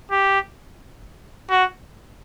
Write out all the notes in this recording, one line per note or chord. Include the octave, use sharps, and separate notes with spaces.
G4
F#4